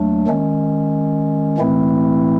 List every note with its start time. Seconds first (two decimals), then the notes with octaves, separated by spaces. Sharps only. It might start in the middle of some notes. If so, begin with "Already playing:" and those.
Already playing: D#2 F#3 A3 D4
0.27 D#3 G#3 C#4
1.58 A2 E3 A3 C4 E4